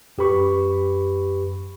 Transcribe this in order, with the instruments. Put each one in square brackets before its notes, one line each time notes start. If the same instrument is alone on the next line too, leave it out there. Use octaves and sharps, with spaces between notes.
[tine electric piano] F#2 G4 B4 B5 C#6